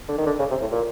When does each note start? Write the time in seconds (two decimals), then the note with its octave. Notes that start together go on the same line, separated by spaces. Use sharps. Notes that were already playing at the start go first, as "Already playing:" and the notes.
0.08 D3
0.18 D#3
0.26 D3
0.39 C#3
0.51 C3
0.61 A2
0.72 A#2